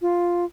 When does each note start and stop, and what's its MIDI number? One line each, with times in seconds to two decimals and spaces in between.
0.02 0.45 65